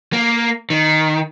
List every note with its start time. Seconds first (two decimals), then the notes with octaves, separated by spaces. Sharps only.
0.13 A#3
0.70 D#3